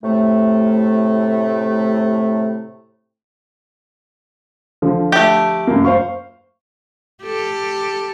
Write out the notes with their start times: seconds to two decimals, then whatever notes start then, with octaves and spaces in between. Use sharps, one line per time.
0.04 A2 C3 A3
4.82 D3 F3
5.12 A3 G4
5.67 F#2 A#3
5.85 C5 F5 C#6
7.23 G4 A4